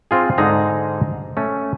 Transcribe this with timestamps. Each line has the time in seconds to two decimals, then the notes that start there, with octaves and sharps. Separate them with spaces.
0.11 C4 F4 G#4
0.38 G#2 D3 D#4 G#4 A#5
1.37 A3 C#4